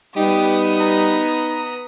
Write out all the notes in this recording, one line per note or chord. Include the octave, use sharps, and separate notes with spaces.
G3 B3 D#4 G4 D#6
A#5